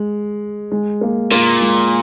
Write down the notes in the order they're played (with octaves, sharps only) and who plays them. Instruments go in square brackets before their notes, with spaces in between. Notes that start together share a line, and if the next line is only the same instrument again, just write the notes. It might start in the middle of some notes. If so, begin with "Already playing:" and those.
Already playing: [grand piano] G#3
G#3
A#3
[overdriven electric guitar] A#2 [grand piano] A#3
[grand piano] G#3